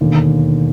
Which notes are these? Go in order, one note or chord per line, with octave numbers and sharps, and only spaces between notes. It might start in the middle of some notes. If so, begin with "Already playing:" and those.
E1 D#2 D3